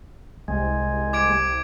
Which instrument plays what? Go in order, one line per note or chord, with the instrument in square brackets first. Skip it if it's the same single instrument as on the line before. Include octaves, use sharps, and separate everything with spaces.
[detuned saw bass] C2 [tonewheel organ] G#3
[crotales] D6 G#6 D7